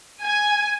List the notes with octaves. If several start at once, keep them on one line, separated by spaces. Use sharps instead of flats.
G#5